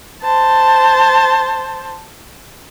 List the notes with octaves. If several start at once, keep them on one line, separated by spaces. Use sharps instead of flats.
C5 A5